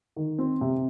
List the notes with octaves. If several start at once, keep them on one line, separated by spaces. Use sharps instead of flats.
D#3
C4
C3